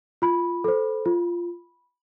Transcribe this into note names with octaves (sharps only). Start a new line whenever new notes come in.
F4 B5
A4 C5
F4